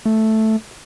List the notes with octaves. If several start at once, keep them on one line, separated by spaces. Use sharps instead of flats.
A3